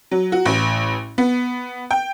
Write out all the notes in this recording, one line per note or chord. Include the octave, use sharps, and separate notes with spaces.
F#3
F#4
A1
B3
G5